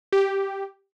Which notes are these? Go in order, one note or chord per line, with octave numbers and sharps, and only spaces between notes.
G4